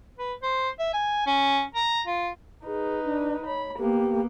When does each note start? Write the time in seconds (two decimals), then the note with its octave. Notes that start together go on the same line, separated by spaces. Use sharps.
0.19 B4
0.42 C5
0.79 E5
0.94 G#5
1.27 C#4
1.75 A#5
2.07 F4
2.66 D#4 G#4 B4
3.04 D4
3.47 C#5 B5
3.79 A#3 B3 G4